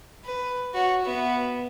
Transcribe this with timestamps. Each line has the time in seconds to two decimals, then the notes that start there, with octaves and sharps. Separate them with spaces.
0.24 B4
0.74 F#4 C#5
1.02 B3 E5